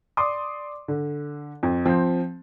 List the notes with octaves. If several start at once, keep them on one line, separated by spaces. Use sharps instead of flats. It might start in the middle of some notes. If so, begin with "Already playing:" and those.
D5 C6 D6 D#6
D3
F2
F3 C4